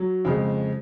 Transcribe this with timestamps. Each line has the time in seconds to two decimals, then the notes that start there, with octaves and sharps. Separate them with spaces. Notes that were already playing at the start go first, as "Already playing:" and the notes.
Already playing: F#3
0.25 F2 C#3 G#3